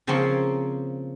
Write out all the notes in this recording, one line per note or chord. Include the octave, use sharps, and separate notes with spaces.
C#3 F3 A#3 C4 C#4